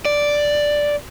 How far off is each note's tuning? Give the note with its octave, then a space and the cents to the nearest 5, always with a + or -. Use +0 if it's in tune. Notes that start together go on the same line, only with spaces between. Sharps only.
D5 +0